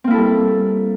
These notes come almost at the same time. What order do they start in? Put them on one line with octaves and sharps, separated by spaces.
C4 A#3 E4 A4 G3